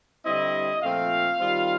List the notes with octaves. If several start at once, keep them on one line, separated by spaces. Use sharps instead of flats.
D3 G3 C4 E4 D#5
A#2 F3 A3 C4 F4 F5
D#3 G3 C4 F4